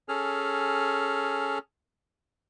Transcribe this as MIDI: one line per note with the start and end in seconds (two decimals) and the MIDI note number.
0.09 1.58 61
0.09 1.58 68
0.09 1.58 69
0.09 1.58 89